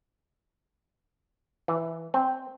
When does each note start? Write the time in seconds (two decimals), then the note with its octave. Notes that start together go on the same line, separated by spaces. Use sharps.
1.68 E3
2.14 C4